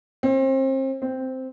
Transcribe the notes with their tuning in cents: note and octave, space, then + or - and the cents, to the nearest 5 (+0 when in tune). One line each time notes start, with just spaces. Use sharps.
C4 +35
C4 -5